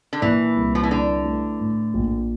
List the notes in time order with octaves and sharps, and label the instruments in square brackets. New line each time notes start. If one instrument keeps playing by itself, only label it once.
[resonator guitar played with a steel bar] D3
[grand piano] A#2 [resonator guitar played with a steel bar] E3
[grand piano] C2
[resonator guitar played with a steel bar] F3
E3
[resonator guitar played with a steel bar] D3 [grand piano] E4
[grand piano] A3
A2
A#1